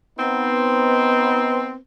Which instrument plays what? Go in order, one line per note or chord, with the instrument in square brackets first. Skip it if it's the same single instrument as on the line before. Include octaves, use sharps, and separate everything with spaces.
[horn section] B3 C4 D#4